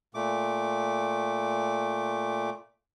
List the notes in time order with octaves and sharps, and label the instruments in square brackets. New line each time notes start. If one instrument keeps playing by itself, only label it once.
[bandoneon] A#2 A3 D6